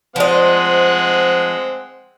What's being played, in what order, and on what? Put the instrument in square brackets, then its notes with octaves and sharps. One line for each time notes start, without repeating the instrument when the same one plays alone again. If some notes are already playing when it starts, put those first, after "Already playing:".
[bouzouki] F3 D#5 [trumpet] G#3 [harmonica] C4 F#5